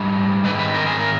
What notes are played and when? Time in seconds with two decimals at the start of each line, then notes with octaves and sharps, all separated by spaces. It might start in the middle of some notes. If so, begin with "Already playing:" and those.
Already playing: G#2 G3
0.44 G#2 D#3 B4
0.59 B4
0.74 A#4
0.86 G#4
0.99 A#4